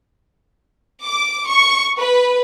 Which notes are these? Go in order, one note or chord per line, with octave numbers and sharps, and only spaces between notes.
D6
C#6
B4